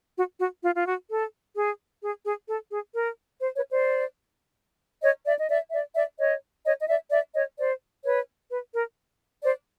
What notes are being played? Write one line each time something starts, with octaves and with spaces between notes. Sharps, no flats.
F#4
F#4
F4
F4
F#4
A4
G#4
G#4
G#4
A4
G#4
A#4
C5
B4 C#5
C5 D5
C#5 D#5
D5 E5
D#5
D5 E5
D5 E5
D5 E5
C#5 D#5
C#5 D#5
D#5
D5 E5
D5 E5
C#5 D#5
C5 D5
B4 C#5
B4
A#4
C5 D5